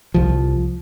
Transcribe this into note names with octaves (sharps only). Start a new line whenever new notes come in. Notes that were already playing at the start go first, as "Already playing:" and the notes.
C2 F3